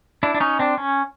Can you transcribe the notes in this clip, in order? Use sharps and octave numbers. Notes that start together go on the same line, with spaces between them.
D4 E4
D4
C#4 D#4
C4 D4
C#4